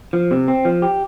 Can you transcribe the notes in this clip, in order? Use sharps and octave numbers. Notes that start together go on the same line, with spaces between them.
F3
C3
C4
F3
G4